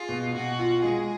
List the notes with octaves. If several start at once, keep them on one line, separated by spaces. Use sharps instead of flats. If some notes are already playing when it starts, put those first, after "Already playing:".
Already playing: F4 G#4
B2
B2 F#4
F4
G#3 G#4